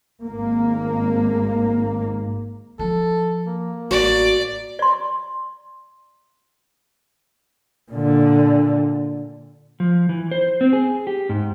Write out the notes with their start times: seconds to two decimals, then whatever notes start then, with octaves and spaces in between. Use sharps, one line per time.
0.23 G#1 A#3
2.79 F3 A4
3.47 A#3
3.91 A1 F#4 D5
4.79 D5 C6
7.92 A#2 D3
9.80 F3
10.09 E3
10.31 C5
10.61 C4
10.73 G#4
11.07 G4
11.29 G#2